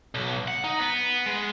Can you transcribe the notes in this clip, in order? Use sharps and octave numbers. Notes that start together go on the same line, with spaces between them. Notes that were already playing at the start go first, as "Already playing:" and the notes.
B1
F#5
D#4
B3
G#3